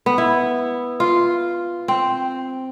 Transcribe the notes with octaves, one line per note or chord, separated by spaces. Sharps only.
B3
E4
F4
C4